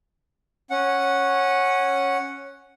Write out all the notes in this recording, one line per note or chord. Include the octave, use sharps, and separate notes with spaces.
C#4 F#5